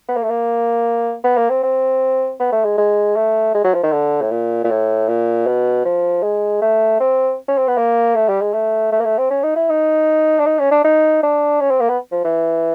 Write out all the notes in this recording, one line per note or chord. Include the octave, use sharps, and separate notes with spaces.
B3
A#3
A3
A#3
B3
A#3
C4
C4
B3
A3
G#3
G#3
A3
G#3
F#3
F3
D#3
D3
A2
A#2
A#2
A2
A#2
B2
F3
G#3
A3
C4
C#4
C4
B3
A#3
A3
G3
G#3
A3
A3
A#3
A3
C4
C#4
D#4
E4
D#4
D4
D#4
C#4
D4
D#4
D4
C#4
C4
A#3
B3
F3
E3